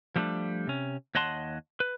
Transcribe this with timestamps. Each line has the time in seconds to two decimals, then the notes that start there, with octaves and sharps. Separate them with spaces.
0.16 F3 G3 A3 C4 D4
0.67 C3 C#4
1.15 D#2 C#5 D#5 F#5 A5 C6
1.80 B4